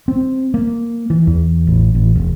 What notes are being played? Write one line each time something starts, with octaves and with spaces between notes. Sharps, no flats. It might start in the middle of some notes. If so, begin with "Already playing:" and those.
C4
A#3
E3
E2
A1
A1
E1